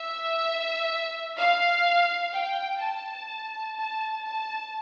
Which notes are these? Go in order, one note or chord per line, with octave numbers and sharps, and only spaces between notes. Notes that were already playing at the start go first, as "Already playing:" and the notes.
Already playing: E5
F5
G5
A5
A5
A5